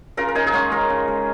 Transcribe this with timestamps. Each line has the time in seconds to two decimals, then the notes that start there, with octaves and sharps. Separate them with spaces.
0.17 C#3 F4 A#4
0.28 A#4
0.35 C#3 D#4 G#4
0.47 G#4
0.53 G#3 C#4 F4
0.71 G#3 F4 A#4
0.89 C#3
1.08 G#3